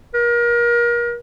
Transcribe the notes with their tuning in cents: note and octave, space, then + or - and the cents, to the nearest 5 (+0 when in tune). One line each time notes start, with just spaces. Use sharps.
A#4 +30